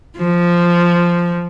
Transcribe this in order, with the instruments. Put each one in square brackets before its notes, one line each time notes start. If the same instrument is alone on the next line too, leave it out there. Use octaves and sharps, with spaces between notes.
[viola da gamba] F3